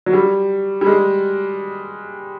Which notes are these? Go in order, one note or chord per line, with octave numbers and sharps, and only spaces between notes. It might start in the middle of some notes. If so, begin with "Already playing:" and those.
F#3
G3
G3
G#3